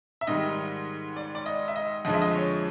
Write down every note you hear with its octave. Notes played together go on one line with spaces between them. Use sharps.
E5
G#2 D#3 G3 D#5
D5
D5
D#5
E5
D#5
F2 D3 F3 G#3 D#5
E5
D#5
C#5